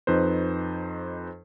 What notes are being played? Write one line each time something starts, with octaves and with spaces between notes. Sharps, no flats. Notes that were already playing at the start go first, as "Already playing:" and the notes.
F2 D#4 B4 C5